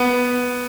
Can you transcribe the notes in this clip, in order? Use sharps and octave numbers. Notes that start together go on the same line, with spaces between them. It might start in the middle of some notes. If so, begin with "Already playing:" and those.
Already playing: B3